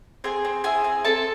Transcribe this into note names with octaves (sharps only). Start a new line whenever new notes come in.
C4 G#4 G#5
C4
E4 G#4 G#5
C4
C4 A4 A5